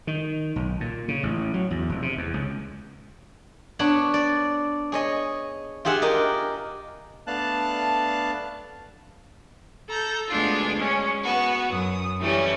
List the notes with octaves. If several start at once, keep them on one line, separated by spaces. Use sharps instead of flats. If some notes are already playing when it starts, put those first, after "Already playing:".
D#3
B1
A#2
C#3
A1
F#3
E2
F1
C3
E2
C#2
B3 D4 C#5 F#5
D5
G#4 C#5 D#5
F4 G4 G#4 E5 F#5
G4 A#4 D#5
A3 B3 D4 F5 A5 F#6
A4 A#5 G6
D2 G#3 B3 D4 F4 G#6
G#3 C#4
B3 F#4 B4
F#2 D#6
E3 G3 A3 C#4